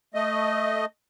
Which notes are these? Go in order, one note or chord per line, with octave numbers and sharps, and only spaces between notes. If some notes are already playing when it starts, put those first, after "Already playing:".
A3 D#5